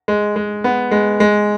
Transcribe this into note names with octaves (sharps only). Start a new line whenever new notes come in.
G#3
G#3
B3
G#3
G#3